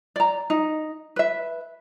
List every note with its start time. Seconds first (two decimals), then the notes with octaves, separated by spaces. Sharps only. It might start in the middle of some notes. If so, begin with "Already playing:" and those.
0.16 D5 A#5
0.50 D#4
1.16 B4 E5